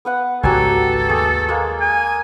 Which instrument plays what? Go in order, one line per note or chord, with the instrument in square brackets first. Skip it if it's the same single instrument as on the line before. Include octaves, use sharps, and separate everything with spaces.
[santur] B3 B4 F#5
[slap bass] G#1 C#2 [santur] F#3 G4 G#5 [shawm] A4
[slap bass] D#2 [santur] A3 G#4
[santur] G#3 A#3
[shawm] G#5